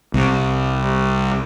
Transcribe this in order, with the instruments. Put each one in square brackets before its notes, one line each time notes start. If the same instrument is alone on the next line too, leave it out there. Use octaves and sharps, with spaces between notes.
[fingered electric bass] C2